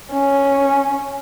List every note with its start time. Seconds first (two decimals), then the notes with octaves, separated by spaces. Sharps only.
0.12 C#4